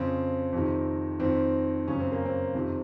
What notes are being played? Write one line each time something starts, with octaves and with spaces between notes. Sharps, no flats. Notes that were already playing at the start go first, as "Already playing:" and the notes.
Already playing: F2 C#3 C4
F2 C3 D#3
F2 D#3 C4
F#2 C#3 C#4
C4
A#3
C4
F2 C3 D#3